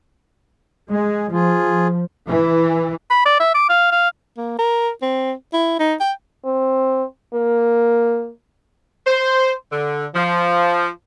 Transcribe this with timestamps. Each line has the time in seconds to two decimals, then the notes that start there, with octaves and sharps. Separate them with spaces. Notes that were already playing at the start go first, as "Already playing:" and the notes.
0.91 G#3 G#4
1.32 F3 F4 G#4
2.28 E3
3.10 B5
3.26 D5
3.40 E5
3.55 D6
3.70 F5
3.92 F5
4.37 A#3
4.59 A#4
5.02 C4
5.53 E4
5.79 D#4
6.00 G5
6.45 C4
7.34 A#3
9.06 C5
9.72 D3
10.15 F3